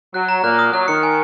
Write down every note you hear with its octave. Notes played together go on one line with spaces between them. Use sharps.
F#3 F#6
A#5
A#2 A#3 F#6
D#6
F#3 F#6
D#3 C#7
G#5